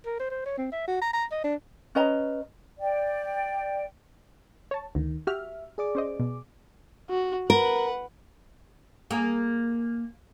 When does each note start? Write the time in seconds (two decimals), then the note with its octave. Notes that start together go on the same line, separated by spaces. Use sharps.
0.06 A#4
0.19 C5
0.31 C5
0.46 C#5
0.58 C4
0.72 E5
0.88 F#4
1.02 A#5
1.13 A#5
1.31 D#5
1.44 D4
1.95 C#4 B4 D#5 A#5
2.80 D5 G5
4.71 C#5 A5
4.95 D2 D#3
5.27 F#4 G4 E5 F6
5.78 G#4 D5 D6
5.95 C#4 C5 D#5
6.20 B2
7.10 F#4
7.50 A#4 B4 F#5
9.11 A#3 G#4